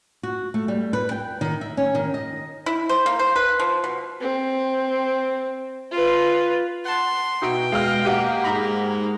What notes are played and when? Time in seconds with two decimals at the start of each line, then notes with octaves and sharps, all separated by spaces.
0.23 F#4
0.54 A3
0.68 G3
0.93 B4
1.11 G5
1.41 D#3
1.61 E5
1.77 C#4
1.95 D#3
2.14 D#5
2.66 E4
2.89 C5
3.06 A#3
3.19 C5
3.36 B4
3.60 F3
3.84 B2
4.21 C4
5.91 F4 B4
6.85 F#5 A5 C6
7.42 B2 D#4 E4 F#4 G5
7.72 G#3 D#5 F5 F6
8.05 A#3 G4 D#5 F5 F#5 D#7
8.44 G#2 D#4 A#5 B5